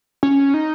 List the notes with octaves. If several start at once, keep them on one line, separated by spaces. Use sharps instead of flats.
C#4
D#4